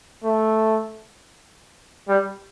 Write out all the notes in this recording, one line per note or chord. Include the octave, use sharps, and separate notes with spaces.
A3
G3